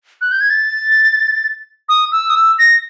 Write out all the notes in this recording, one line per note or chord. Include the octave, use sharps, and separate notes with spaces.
F#6
G6
G#6
A6
D#6
E6
D#6
E6
A#6